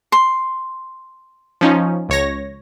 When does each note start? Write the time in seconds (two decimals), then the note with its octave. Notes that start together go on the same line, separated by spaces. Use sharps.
0.12 C6
1.61 F3 C#4 D#4
2.09 C#2 C#5 A#6